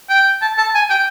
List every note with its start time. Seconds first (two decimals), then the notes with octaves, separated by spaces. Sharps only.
0.09 G5
0.42 A5
0.58 A5
0.75 G#5
0.90 G5